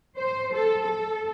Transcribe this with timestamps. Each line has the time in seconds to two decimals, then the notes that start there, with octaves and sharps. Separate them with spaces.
0.17 C5
0.53 A4
0.83 A4